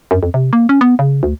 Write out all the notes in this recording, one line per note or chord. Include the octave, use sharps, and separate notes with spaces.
F#2
F2
C3
A#3
C#4
B3
C#3
D2